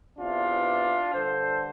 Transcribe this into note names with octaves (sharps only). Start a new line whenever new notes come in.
E2 C3 E3 D4 F4
G2 D3 A4 C5